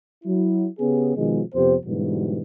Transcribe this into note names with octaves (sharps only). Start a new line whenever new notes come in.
F#3 E4
C#3 B3 C#4 G4 G#4
B2 D#3 F3 G#3
F2 C3 B3 G4 C5
G#2 B2 D3 E3 F#3 G3